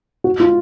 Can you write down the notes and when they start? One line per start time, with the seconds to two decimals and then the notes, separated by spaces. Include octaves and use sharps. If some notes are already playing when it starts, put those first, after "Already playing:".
0.24 F#4
0.40 F4